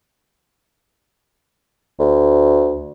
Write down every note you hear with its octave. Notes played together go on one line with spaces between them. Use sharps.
D2